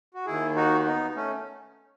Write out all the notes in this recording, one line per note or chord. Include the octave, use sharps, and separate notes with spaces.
F#4
D#2 D#3 E4 G#4
D#4 F#4
B3 D#4
A3 C#4